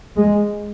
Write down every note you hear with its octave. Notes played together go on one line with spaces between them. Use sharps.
G#3